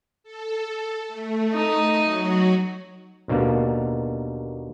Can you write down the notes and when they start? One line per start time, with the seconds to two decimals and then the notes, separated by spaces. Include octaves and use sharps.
0.23 A4
1.08 A3
1.53 D#4 D#5
2.03 F#3 F#4
3.28 D#2 B2 D3 A#3